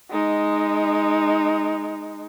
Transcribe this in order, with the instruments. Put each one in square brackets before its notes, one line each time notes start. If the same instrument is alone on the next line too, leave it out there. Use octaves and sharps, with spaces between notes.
[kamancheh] G#3 D#4